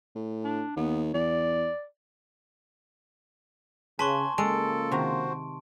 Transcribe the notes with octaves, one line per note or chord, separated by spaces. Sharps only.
A2
D4
D#2 B3
E2 D5
C#3 B4 G#5 A5 C6 C#6
C#3 F3 G#3 A#3 A4 D7
C3 D#3 F#4 C5